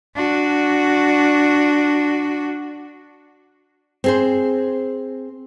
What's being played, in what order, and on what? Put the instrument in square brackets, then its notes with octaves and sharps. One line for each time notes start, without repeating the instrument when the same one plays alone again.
[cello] D4 F#4
[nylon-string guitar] C4 G#4 C5